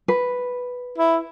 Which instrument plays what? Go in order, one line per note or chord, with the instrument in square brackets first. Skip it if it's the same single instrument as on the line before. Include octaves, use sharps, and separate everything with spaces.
[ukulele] B4
[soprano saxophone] E4